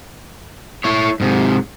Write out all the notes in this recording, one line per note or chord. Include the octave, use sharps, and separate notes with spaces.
E4 C#5
G#2 C3